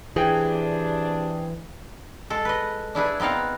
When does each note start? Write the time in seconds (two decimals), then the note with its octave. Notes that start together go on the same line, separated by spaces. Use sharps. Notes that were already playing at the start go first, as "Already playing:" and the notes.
0.16 C3 E3 D4 G#4 G5
2.30 G#3 A4
2.45 B4 D#5
2.95 D4 E4 G#4 B4
3.20 B3 C4 D#4 F5 F#5